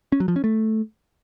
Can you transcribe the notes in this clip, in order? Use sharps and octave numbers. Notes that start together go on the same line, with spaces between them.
C#4
F#3
F3
C#4
A3